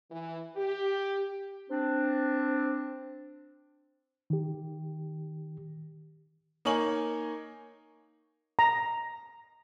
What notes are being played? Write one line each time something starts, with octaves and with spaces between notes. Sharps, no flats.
E3
G4
C4 D4
D#3 G4
A#3 D#4 C#5 G#5 F#7
A#5